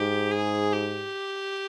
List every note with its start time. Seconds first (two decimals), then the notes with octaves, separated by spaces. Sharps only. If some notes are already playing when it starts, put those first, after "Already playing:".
Already playing: G#2 G4
0.32 G#4
0.73 G4